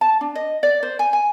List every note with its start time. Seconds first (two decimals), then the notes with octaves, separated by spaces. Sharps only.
0.01 A5
0.21 D4
0.35 D#5
0.63 D5
0.83 C5
0.99 G#5
1.13 G#5